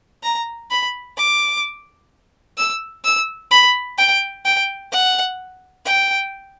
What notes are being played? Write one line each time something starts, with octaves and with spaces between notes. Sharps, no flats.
A#5
B5
D6
E6
E6
B5
G5
G5
F#5
G5